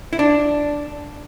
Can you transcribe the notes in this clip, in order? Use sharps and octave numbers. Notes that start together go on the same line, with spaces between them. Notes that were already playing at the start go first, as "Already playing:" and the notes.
E4
D4